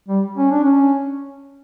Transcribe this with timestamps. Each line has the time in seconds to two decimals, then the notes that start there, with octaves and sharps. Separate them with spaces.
0.08 G3
0.37 C#4
0.51 D4
0.64 C#4